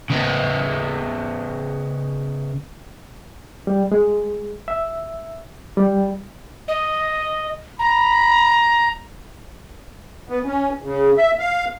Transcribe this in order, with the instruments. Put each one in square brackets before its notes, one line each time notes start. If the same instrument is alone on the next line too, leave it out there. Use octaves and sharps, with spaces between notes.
[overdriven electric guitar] C#3 B3
[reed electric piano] G3
G#3
E5
G3
[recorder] D#5
[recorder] A#5 [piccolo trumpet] B5
[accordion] B3
C#4
C#3
E5
F5